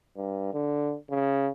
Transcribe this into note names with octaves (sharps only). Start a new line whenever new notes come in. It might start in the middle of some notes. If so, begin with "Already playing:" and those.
G2
D3
C#3